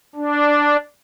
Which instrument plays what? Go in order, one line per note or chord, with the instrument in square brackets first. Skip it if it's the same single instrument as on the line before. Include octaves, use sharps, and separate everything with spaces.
[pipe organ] D4